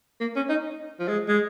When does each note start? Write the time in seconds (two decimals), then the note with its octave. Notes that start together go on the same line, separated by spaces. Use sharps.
0.21 A#3
0.36 C#4
0.50 D#4
1.00 F3
1.08 G#3
1.28 G#3